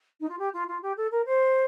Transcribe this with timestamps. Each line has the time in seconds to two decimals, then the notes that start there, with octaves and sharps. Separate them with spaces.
0.20 D#4
0.29 F4
0.39 G4
0.53 F4
0.68 F4
0.82 G4
0.97 A4
1.12 A#4
1.26 C5